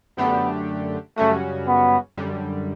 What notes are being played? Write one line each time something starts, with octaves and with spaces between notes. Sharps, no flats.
F#2 D3 A3 B3 D4 G4
F#2 C#3 G3 A3 C#4 F#4
B3
F#2 D3 G3